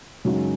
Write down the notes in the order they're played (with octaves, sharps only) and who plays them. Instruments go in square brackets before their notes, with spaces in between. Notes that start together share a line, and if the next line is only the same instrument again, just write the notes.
[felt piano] F#2 C#3 G#3 D#4 F#4